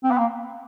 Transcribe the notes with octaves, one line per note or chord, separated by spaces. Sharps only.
C4
B3
A#3